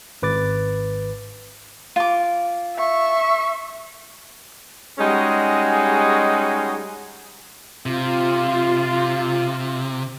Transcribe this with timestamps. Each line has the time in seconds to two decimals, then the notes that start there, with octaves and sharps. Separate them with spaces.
0.22 G#1 B4 D6 A6
1.96 F4 D6
2.76 E5 C#6
4.99 G3 G#3 C#4 D#4 F#4 G#4
7.86 C3 F4